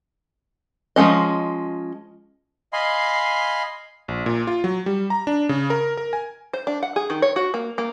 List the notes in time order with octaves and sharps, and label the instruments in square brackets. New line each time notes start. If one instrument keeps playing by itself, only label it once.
[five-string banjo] F3 G#3 C#4 D#5
[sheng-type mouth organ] D#5 F5 G#5 B5 C6
[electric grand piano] A#1
A#2
F4
F#3
G3
A#5
D4
C#3
A#4
A#4
G#5
[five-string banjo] C5
D4
F#5
G#4
D#3
C#5
F#4
A#3
A#3